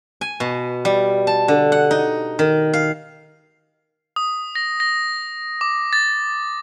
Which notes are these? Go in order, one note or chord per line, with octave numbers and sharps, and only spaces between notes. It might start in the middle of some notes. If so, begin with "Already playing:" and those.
G#5
B2
G3
A5
D3
F#5
D#4
D#3
F5
D#6
A#6
A#6
D6
A6